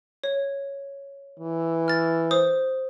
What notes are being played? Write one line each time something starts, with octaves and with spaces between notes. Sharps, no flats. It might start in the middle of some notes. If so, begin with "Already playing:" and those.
C#5
E3
F6 A6
C5 D#6